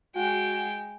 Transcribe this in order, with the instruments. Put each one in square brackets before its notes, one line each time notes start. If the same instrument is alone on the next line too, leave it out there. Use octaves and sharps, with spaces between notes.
[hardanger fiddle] G#3 G5 [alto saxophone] F#4